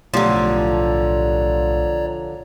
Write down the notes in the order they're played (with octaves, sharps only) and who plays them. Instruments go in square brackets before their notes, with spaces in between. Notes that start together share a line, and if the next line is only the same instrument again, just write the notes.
[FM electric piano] B1 A2 G4 [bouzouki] D3 F3 [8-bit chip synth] C#5 D5 A#5